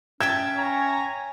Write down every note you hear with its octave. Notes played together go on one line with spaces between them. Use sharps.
C#4 E5 G5 A5 G#6
C#5 G#5 A#5